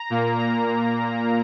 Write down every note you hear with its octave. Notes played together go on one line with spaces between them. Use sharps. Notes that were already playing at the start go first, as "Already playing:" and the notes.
Already playing: A#5
A#2 A#3
A#5